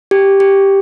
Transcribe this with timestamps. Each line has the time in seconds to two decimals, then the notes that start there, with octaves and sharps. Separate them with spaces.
0.11 G4
0.40 G4